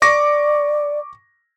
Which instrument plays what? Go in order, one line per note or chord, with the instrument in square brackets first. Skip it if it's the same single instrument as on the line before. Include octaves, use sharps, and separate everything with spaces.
[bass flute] D5 [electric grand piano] C#6 D6 A#6